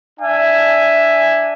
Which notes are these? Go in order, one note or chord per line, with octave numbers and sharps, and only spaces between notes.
D4 E5 G#5